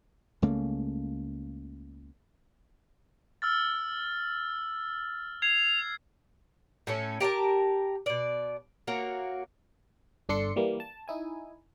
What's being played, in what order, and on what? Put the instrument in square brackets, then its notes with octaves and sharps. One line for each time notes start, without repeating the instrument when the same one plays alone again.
[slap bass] C#2 C#3 A3 A#3
[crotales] E6 F6 A6
[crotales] G#6 C7 [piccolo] F7
[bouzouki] A2 C#4 A4
G4 A#4 D5 A5
B2 D5
A#3 F#4 C#5
[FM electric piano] G1 D4 A4 C6 C#7
E3 G3 A#3
A5
D#4 E4 G#5